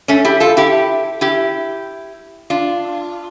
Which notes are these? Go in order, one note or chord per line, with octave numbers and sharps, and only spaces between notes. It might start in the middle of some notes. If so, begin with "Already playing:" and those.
A3 C#4
E4 G4
F4 A4
E4 G4
E4 G4
D4 F4